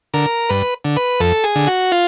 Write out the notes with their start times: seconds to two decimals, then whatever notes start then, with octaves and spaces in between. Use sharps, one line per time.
0.14 D3 A#4
0.49 G2 B4
0.85 D3
0.97 B4
1.20 F2 A4
1.44 G#4
1.56 D3
1.67 F#4
1.92 F4